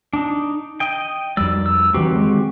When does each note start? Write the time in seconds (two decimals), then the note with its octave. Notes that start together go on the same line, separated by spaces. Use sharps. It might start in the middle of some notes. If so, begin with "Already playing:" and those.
0.13 D4 D#4
0.80 D#5 G5
1.37 F2 G3 D5 E6
1.66 E6
1.94 D#3 E3 F#3 C4 F#4 G4
2.15 G#3